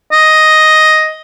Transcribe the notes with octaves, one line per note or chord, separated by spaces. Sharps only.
D#5